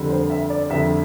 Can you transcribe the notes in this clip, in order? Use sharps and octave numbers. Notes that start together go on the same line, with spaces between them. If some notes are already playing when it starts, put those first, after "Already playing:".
Already playing: F2 D3 G3
C5
E5
D5
F2 D3 G3 E5